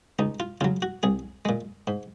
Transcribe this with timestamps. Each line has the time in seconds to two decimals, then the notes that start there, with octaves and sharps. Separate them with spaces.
0.19 C#2 D#4
0.40 F4
0.61 C#3 F#3 F4
0.82 F#4
1.03 C2 G#4
1.45 A#2 G#3
1.87 G#2